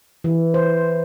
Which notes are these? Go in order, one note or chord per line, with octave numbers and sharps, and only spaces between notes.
E3
C5